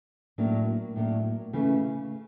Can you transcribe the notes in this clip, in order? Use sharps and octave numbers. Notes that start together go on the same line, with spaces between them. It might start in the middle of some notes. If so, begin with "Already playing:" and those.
A2 F#3 A#3 D4
A2 F#3 A#3 D4
C#3 E3 A3